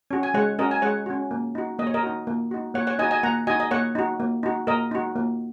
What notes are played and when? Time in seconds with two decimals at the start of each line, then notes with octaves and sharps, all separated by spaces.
0.11 C#4 F#4
0.23 G#5
0.34 G#3 C#5 F#5
0.59 C#4 F#4 A#4 D#5
0.71 G#5
0.82 G#3 C#5 F#5
1.06 C#4 F#4
1.31 A#3
1.55 D#4 F#4
1.79 A#3 D#5
1.87 C#5
1.94 A#4 D#5
2.03 D#4 F#4
2.27 A#3
2.51 D#4 F#4
2.74 A#3 C#5 F#5
2.87 C#5 F#5
2.99 D#4 D#5 G#5
3.02 F#4
3.11 D#5 G#5
3.23 A#3 F#5 A#5
3.47 D#4 F#4 D#5 G#5
3.60 D#5
3.71 A#3 C#5 F#5
3.95 D#4 F#4
4.20 A#3
4.43 D#4 F#4
4.67 A#3 A#4 D#5
4.91 D#4 F#4
5.16 A#3